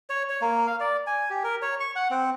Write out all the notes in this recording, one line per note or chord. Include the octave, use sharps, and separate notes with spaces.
C#5
C#5
A#3
F5
D5
G#5
G4
A#4
C#5
C#6
F#5
C4